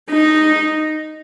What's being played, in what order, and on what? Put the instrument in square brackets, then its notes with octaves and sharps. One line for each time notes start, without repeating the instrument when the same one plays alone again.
[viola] D#4